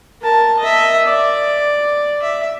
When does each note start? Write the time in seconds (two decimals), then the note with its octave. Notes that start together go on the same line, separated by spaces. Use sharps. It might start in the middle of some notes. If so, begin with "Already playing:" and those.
0.22 A#4 A5
0.59 D#5 E5
1.05 D5
2.23 E5